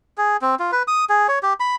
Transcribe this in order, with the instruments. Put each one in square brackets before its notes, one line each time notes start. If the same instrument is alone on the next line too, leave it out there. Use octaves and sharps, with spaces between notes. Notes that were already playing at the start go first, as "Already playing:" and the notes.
[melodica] G#4
C4
F4
B4
D#6
G#4
C#5
G4
B5